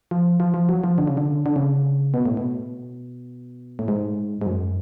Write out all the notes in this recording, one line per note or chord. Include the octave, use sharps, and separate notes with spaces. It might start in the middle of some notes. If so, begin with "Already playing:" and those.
F3
F3
F3
F#3
F3
D3
C#3
D3
D3
C#3
B2
A2
B2
A2
G#2
G#2
F#2